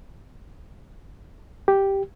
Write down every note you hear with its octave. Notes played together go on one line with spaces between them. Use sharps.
G4